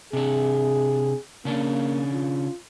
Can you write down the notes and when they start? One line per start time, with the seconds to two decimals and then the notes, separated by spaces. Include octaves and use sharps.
0.13 C3 D4 G#4
1.45 C#3 A#3 C#4 D4
2.13 F4